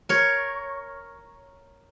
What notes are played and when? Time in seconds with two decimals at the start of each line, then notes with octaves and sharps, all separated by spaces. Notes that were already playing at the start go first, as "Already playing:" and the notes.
0.09 A#4 C#5